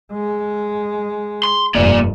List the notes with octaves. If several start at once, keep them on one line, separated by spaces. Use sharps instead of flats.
G#3
C6
F1 G2 A#3 D5